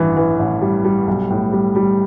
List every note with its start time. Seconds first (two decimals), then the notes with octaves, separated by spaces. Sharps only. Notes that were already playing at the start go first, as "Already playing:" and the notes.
Already playing: A1 G2 E3
0.17 E3
0.39 A1
0.61 G3
0.85 G3
1.07 B1
1.30 A2
1.52 G3
1.75 G3